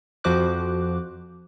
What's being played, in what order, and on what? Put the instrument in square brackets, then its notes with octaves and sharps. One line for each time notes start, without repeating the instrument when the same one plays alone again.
[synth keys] F2 F3 F#4 C5 D6 F#6